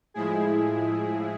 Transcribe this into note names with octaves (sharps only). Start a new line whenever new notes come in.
A2 F3 G#3 E4 G#4